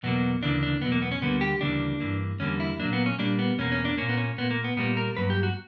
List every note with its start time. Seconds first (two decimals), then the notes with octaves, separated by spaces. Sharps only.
0.03 E2 B2 F#3 A#3 B3
0.43 D2 C#3 E3 A#3 D4
0.63 D4
0.82 E2 B2 F#3 B3
0.92 A#3
1.02 B3
1.12 C#4
1.21 D2 D3 G3 A#3 B3
1.41 G4
1.61 D2 C#3 E3 G3 A#3 D4
2.00 G2 E3 A#3
2.40 E2 D3 G3 A#3 C#4
2.60 E4
2.80 A#2 F#3 A#3 D4
2.93 B3
3.06 C#4
3.19 A#2 G3 A#3 D4
3.39 B3
3.58 E2 B2 A#3 C#4
3.72 C#4
3.85 D4
3.98 A#2 A#3 C#4
4.09 B3
4.17 C#4
4.38 A#2 A#3 B3
4.51 A#3
4.64 B3
4.77 A#2 G3 A#3 B3
4.97 A#4
5.17 G2 F#3 A#3 B4
5.30 G4
5.43 F#4